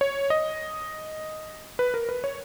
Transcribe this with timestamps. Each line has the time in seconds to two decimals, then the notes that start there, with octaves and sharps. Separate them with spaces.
0.01 C#5
0.30 D#5
1.79 B4
1.94 A#4
2.09 B4
2.24 C#5